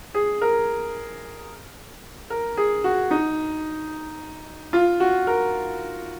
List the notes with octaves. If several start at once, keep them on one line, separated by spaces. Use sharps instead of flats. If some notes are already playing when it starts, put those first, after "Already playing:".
G#4
A#4
A#4
G#4
F#4
D#4
F4
F#4
A#4